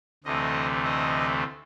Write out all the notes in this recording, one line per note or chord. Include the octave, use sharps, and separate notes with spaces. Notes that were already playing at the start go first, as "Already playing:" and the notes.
D2 C3 E3 A3 D#5
D#5